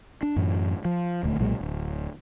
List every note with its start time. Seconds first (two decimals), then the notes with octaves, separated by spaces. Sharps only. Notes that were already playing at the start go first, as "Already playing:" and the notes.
0.23 D4
0.36 F#2 A2 E3
0.85 F3
1.23 D#1 D2 A3
1.40 B1 A#2 F#3 G#3
1.61 D1